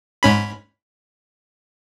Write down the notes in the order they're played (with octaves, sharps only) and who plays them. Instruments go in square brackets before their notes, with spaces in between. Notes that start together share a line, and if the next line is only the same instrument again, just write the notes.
[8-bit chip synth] G#2 C#4 B5